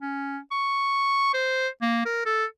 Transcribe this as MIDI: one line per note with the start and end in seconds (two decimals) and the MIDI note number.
0.02 0.38 61
0.51 1.30 85
1.34 1.68 72
1.82 2.01 58
2.05 2.23 70
2.26 2.45 69